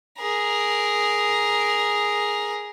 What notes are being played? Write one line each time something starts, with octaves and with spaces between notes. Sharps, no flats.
G#4 A#4